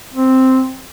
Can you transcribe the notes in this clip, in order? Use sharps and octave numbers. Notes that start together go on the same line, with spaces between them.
C4